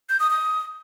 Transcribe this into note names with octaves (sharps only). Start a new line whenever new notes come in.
G6
D#6
D#6